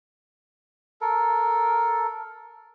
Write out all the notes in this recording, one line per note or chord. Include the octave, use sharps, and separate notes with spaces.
A4 A#4